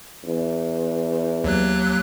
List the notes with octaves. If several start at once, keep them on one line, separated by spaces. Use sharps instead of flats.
E2
D#2 F#3 F#6